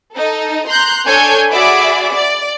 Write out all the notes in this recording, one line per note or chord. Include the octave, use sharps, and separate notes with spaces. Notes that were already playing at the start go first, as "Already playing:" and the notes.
D#4 A4
A#5 C6 F#6 G6
D4 A4 C#5 G#5 G6
F#4 G#4 D5 E5 B5 D6
D5